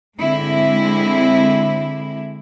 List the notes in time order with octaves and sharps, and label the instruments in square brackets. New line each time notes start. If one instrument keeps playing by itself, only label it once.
[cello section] D3 G#3 C4 E4